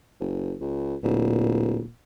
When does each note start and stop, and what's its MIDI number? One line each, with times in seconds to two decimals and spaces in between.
0.20 0.54 30
0.61 0.95 37
1.03 1.81 26
1.03 1.88 46